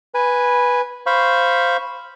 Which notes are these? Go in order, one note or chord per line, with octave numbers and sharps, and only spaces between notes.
B4 G#5
C5 F5 B5 C#6